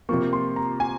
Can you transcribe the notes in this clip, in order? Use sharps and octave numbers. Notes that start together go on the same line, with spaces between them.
C3 F3 A#3 C#6
C6
A#5
G#5